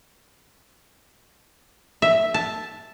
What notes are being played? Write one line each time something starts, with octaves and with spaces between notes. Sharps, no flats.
E5
A5